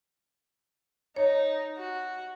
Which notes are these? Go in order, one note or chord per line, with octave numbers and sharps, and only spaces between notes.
D#4 C#5
F#4